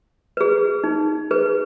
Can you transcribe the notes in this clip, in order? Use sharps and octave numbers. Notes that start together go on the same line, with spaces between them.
G#4 B4
D#4
G#4 B4